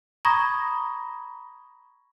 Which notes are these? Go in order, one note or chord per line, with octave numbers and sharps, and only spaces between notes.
A#5 B5 C#6 D#6 G#6 A#6